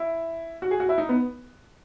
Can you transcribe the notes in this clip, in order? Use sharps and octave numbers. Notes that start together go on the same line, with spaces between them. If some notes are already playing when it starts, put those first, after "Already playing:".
Already playing: E4
F#4
G#4
F#4
E4
D#4
B3